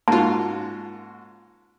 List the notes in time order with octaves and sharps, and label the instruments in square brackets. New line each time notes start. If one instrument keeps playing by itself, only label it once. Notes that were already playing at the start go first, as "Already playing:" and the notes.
[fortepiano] G#2 C#4 F#4 [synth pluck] A#3 F4 [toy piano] A5